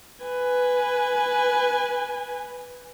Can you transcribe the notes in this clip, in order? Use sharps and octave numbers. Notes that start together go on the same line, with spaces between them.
B4 G#5